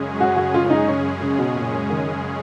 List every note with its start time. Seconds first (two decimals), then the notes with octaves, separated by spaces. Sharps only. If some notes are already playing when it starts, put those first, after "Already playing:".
Already playing: F#2 C#3 G#3 C#4 G#4
0.20 F#4
0.36 F#4
0.54 F4
0.65 F4
0.70 D#4
0.88 C#4
1.21 C#3
1.39 B2
1.55 A#2
1.72 C#3
1.90 D#3